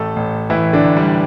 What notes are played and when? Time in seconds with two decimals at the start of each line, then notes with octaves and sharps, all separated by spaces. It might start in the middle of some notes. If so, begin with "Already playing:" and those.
Already playing: A1 A3 A4
0.16 A1
0.50 A2 E3 E4
0.73 D3 D4
0.84 A1
0.97 G3